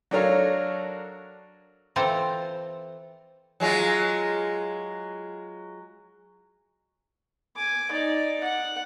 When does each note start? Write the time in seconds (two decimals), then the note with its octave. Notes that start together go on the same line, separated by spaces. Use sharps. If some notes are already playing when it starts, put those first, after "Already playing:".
0.11 F#3 D4 A4 A#4 C#5 F5
1.96 E3 C4 F4 A4 C5
3.60 F#3 G#3 F4
7.56 G#5 D6
7.91 D#4 D5
8.44 F#5